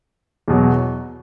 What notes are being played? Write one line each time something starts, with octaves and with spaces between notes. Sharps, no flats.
E2 B2 F#3